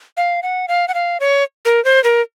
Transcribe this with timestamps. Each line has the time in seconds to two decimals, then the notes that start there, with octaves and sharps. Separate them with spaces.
0.17 F5
0.43 F#5
0.68 F5
0.88 F#5
0.94 F5
1.20 C#5
1.65 A#4
1.85 C5
2.04 A#4